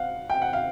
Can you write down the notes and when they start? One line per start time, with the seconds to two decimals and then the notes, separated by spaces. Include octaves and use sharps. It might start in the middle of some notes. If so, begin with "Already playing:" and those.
Already playing: F5 F#5
0.30 G5
0.42 F#5
0.53 F5